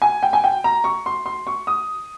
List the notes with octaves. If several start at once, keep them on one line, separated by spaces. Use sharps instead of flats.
G#5
G5
G#5
G5
A#5
C#6
C6
C6
C#6
D#6